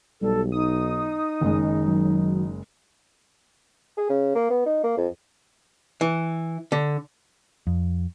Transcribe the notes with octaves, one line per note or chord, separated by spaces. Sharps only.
B1 G3 A4
D#4 D#6
F#1 D#3 G#3
F#3
G#4
C#3
A#3
B3
D#4
A#3
F2
E3
D3
F2